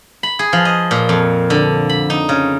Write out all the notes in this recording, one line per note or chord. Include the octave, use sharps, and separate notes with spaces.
B5
G#4
F3
D#5
A#2
F2
D3
B5
D#4
C#3